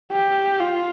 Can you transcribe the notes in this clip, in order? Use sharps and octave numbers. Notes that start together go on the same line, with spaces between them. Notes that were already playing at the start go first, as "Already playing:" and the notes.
G4
F4